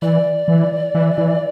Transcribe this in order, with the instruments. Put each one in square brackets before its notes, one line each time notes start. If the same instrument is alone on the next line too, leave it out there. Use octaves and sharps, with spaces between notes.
[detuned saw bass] E3 [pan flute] D5
[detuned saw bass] E3
E3
E3